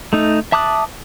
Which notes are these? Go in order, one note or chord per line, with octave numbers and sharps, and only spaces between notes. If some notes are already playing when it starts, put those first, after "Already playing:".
A3 D#4
E5 A5 D6 D#6 F#6